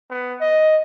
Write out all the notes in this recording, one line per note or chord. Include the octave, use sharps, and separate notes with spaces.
B3
D#5